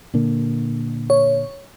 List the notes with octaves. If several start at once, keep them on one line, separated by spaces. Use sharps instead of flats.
A#2 D3 A#3
C#5